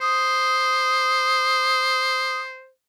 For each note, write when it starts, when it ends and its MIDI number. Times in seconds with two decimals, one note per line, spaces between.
0.01 2.70 72
0.01 2.41 87